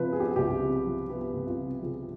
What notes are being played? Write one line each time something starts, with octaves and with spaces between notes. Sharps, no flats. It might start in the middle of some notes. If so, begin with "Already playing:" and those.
Already playing: C3 F3 B4
B3 G#4
G4
G#4
C2 G4
C3
F3
B3 G4
C2
F4
C3
F3 G#4